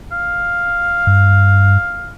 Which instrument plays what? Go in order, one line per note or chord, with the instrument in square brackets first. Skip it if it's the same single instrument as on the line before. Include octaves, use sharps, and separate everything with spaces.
[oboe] F5
[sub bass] G2